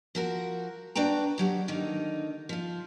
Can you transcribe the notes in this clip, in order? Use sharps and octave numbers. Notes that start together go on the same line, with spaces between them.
F3 F#4 A#4
D4 F#4 B4 G5 A#5
D#2 F#3 G4
D3 D#3 A#3 D#4
F3 F4